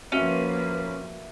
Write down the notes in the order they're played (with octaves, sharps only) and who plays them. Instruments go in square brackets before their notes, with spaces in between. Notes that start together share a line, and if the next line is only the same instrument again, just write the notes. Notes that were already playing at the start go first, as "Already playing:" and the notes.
[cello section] F3 A#3 B4 [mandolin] C#4 [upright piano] F#4 E5 D#7